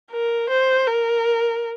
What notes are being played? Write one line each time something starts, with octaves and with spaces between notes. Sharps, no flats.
A#4
C5
A#4